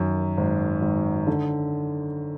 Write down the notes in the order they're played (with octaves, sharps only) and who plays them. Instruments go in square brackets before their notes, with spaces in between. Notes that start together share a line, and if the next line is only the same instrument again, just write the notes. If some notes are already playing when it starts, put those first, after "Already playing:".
Already playing: [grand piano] F#2 D#3
G#1
G#1
D3